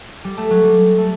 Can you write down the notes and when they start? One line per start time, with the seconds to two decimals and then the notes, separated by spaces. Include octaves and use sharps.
0.24 G3
0.37 A3
0.50 F#3
0.64 G3
0.98 A3